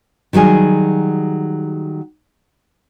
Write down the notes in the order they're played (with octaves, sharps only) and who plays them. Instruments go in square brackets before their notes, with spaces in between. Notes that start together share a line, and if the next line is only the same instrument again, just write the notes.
[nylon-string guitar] D#3 F#3 G3 G#4